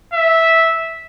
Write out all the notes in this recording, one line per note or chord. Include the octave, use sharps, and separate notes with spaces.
E5